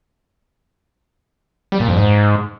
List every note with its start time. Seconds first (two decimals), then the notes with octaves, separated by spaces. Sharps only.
1.72 G3
1.80 A#2
1.88 F2
1.96 G#2